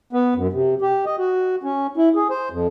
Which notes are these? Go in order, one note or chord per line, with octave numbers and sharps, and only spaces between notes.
B3
F#2
C3
G4
D#5
F#4
C#4
E4
G#4
C5
F2